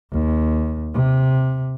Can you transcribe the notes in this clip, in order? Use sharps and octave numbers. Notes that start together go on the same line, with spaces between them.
D#2
C3